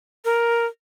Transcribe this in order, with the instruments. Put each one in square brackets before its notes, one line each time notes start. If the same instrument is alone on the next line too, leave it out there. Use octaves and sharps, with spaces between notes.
[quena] A#4